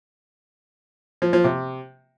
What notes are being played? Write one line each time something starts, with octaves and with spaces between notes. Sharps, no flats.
F3
F3
C3